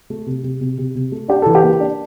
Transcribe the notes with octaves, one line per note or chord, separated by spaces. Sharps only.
A3
C3
C3
C3
C3
C3
A3
D4 G4
E3 A4
G4
A#3
D4